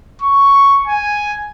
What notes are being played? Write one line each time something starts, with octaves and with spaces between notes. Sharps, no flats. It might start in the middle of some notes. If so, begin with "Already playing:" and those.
C#6
G#5